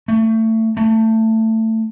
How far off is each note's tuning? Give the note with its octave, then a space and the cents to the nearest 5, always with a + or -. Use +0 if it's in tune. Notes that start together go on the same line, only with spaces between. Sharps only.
A3 +25
A3 +20